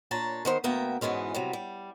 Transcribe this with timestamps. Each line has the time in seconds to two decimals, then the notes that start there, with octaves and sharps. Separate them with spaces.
0.11 A#2 D4 C#5 A5 A#5
0.45 D#3 B3 C5
0.64 D2 A#3 B3 E5 G5 A#5
1.01 G#2 B2 E3 G#3 C#4
1.34 C3 F#3 G3
1.53 G3